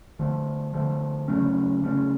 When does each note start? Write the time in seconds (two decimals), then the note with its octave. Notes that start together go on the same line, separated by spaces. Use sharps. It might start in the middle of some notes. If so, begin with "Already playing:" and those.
0.19 D3 F3 A3
0.74 D3 F3 A3
1.28 C#3 F#3 A3 C#4
1.82 C#3 F#3 A3 C#4